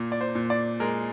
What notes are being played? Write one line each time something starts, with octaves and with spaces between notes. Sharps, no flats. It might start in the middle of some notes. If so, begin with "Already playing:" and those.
Already playing: A#2
D5
C5
A#2
D5
G#3 A#4